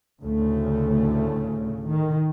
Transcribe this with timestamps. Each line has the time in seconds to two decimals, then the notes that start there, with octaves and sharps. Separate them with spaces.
0.22 D2 A2 C#3 A3
1.88 D#3